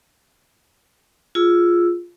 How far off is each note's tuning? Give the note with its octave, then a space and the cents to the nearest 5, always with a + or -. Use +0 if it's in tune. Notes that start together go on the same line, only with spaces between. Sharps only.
F4 +0 G#4 +0 E6 +0